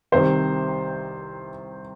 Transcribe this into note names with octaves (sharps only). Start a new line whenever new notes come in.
C2 C3 D#3 C5